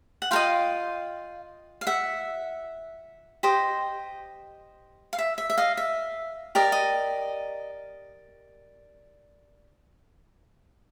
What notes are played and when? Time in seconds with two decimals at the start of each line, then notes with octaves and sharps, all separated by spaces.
0.22 F#5
0.31 F4 A#4 F5 G5
0.36 D#5
1.81 F5
1.87 E5 F#5
3.43 G4 C5 D#5
5.13 F5
5.18 E5
5.38 E5
5.50 E5
5.57 D#5 F5
5.77 E5
6.55 G4 A#4 D5 D#5
6.72 D#5